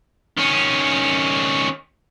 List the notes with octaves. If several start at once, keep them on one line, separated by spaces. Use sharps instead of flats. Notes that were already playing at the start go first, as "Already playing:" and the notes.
D#3 C#4